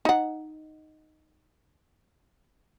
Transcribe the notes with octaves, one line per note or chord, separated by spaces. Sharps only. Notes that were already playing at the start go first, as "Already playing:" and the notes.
D#4 F#5